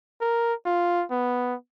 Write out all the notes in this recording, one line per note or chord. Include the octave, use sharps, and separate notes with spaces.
A#4
F4
B3